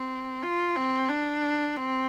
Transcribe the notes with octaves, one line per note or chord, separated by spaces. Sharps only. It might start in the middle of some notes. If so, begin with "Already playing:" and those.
Already playing: C4
F4
C4
D4
C4